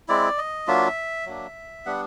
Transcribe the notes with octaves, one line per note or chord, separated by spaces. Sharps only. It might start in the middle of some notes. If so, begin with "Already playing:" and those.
G#3 C4 E4 D5
D#5
F#3 A#3 D4 F4 E5
F#3 A#3 D4
G3 B3 D4 F#5